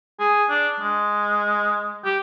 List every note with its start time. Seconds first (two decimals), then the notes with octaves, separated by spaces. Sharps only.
0.20 G#4
0.49 D4
0.80 G#3
2.05 G4